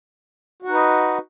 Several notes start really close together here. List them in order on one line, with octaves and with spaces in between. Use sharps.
F#4 F#5 D#4 B4 D#5